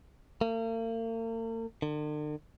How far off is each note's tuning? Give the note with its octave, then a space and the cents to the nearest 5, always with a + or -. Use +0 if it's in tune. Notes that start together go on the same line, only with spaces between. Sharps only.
A#3 -45
D3 +45